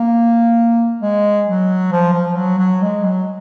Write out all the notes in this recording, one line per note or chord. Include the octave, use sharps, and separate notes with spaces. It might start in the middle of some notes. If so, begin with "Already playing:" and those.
Already playing: A#3
G#3
F#3
F3
F3
F#3
F#3
G#3
F#3